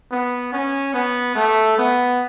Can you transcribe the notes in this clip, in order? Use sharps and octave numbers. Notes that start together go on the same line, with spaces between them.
B3
C#4
B3
A3
B3